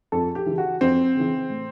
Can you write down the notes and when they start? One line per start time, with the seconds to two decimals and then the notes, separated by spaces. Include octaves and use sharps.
0.12 F2 A4
0.35 G4
0.46 C#3 E3
0.58 F#4
0.81 F2 C4
1.15 C#3 E3
1.50 A2